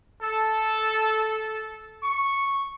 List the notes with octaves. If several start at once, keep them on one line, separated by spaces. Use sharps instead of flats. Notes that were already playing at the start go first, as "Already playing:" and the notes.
A4
C#6